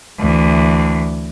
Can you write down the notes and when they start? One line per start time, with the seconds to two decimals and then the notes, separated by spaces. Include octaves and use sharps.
0.19 D2 E3